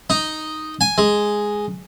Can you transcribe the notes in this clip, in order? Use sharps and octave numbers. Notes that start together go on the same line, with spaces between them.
D#4
G#5
G#3